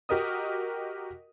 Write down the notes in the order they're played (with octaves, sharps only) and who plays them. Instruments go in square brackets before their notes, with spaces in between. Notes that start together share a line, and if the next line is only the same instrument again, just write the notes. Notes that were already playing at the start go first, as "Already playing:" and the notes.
[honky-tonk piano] F#4 G4 A#4 D#5 D#6